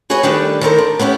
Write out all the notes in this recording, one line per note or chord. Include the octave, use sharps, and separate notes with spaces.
F#4 G#4 B4 C#5 D#5
D#3 G3 A3 D4 A4 B4
D#3 A4 A#4 C5
D4
B3 C#4 E4 G4